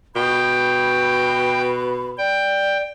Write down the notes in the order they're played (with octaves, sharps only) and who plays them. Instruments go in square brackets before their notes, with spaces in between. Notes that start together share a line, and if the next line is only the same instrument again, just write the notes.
[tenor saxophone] B2 [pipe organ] G5 [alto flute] B5
[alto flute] D5 [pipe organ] G5